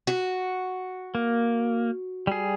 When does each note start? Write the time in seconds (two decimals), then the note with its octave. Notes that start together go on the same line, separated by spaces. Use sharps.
0.07 F#4
1.15 A#3
2.27 G3 G#4